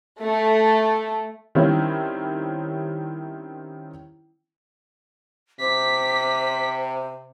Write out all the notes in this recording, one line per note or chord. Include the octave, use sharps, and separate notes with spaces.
A3
D#3 G3 C4 C#4 E4
C3 C5 D6 B6